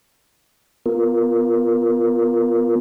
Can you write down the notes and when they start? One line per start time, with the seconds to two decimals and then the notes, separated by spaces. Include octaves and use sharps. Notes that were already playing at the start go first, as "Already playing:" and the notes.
0.86 B3 F4 A#4